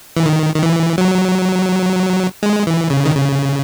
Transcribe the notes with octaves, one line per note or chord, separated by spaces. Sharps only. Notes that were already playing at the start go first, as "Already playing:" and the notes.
E3
D#3
D#3
E3
F#3
G#3
E3
C#3
D#3
C#3